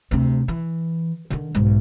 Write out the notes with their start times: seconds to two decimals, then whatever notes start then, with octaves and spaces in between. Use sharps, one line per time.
0.11 D2 C3
0.48 E3
1.30 D3 D#3
1.55 B1 G#2